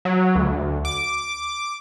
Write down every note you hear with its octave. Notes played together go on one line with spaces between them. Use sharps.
F#3
D2
D6